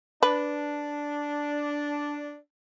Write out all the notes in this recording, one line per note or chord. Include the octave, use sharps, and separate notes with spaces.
D4 B4